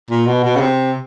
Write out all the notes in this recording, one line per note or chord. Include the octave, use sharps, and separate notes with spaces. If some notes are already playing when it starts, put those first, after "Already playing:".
A#2
B2
B2
C#3
C3